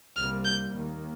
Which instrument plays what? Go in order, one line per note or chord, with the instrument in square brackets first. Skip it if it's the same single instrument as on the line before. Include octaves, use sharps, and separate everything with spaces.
[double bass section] C2 C3 G3 A#3 [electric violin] F6
[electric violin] G6
[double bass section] D#2 D#3 A#3